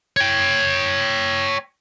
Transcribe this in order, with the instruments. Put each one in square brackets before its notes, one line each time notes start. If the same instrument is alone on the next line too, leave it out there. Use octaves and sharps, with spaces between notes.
[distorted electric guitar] C#5 G5